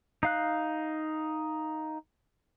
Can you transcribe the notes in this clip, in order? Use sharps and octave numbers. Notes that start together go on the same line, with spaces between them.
D#4 F5 F#6